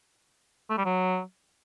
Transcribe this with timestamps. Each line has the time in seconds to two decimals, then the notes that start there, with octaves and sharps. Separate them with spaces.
0.70 A3
0.78 G3
0.85 F#3